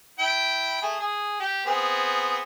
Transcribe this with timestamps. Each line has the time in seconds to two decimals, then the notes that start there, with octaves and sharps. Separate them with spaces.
0.19 E4 G5
0.82 A3 G#4
1.00 G#4
1.40 G4
1.66 B3 C4 G#4